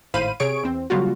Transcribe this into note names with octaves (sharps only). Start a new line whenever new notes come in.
G#1 A2 C5 F5 B5 D#7
C3 G#4 C#5 C#6 D7
E2 C4
C#3 F#3 G3 A#3 F4 F#4